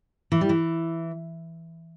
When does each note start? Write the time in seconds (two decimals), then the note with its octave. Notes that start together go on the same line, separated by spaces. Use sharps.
0.32 E3
0.41 G3
0.49 E3